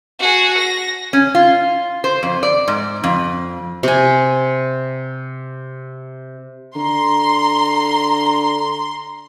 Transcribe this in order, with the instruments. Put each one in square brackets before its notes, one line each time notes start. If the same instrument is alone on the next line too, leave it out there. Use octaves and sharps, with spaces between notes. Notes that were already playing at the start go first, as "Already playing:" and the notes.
[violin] F#4 G#4
A#6
[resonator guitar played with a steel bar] C#4
F4
C5
F2
D5
G#2
F2
[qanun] C3 G#5
[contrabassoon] D3 [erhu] A#5 [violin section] C6